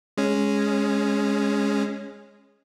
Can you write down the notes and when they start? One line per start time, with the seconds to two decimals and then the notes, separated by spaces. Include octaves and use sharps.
0.18 G#3 C#4